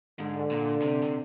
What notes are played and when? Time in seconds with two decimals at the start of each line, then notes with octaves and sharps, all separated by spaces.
0.19 G#2 D3
0.51 A#2
0.82 C3
1.02 C3